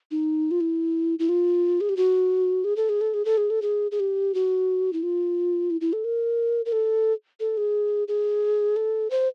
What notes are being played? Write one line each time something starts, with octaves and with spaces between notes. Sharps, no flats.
D#4
F4
E4
E4
F4
G#4
G4
F#4
G#4
A4
G#4
A4
G#4
A4
G#4
A4
G#4
G#4
G4
F#4
E4
F4
E4
E4
A4
A#4
A#4
A4
A4
G#4
G#4
A4
C5